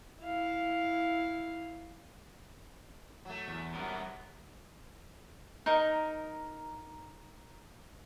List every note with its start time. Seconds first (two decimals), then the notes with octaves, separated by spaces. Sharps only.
0.21 E4 F5
3.25 F#3 A3
3.48 E2
3.74 F#2 F#3 G3 B3 A#4
5.66 D#4 A#4